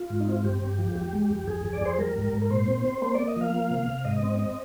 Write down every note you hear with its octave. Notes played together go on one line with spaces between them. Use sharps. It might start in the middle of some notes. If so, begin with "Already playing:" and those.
Already playing: F4
G#2
D#4
C4
F4
G2 G4
G2
F3
F2 G4
G#3
F2
F2 G#4
F2
D5
F2 C5
G3 A#4
G#2
G#2
A#4
A#2 C5
C4
C4
A#3 C5
A#3 D5
D#5
F3 F5
A#3
C3
C3
G#2 D#5
C4
C4